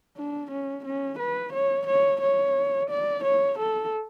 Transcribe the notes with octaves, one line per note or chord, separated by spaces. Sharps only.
D4
C#4
C#4
B4
C#5
C#5
C#5
D5
C#5
A4